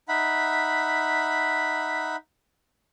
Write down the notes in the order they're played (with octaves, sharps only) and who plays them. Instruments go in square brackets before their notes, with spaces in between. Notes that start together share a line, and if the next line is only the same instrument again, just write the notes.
[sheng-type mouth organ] D#4 E5 F#5 B5